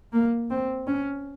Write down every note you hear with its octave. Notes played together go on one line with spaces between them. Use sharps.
A#3
C4
C#4